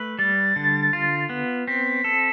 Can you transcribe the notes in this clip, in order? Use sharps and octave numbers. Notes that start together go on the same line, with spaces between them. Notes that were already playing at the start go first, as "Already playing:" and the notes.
Already playing: A3 B4
G3 A6
D3
F4
B3
C4 B6
A4